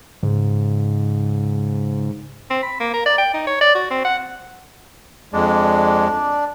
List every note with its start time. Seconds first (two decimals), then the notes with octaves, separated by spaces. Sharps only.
0.23 G#2 C#3
2.50 C4
2.63 B5
2.80 A#3
2.94 A#4
3.06 D5
3.18 G5
3.34 D#4
3.47 C#5
3.61 D5
3.75 F#4
3.90 C4
4.05 F#5
5.33 F2 G#3 D4 D5